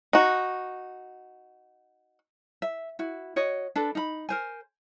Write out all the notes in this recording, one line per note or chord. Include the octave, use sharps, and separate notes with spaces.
D#4 F#4
E5
E4 F#4
F#4 C#5 D#5
D4 A4 B4
D#4 B5
A#4 C5 G#5